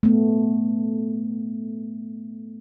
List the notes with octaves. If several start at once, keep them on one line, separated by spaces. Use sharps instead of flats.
A3 B3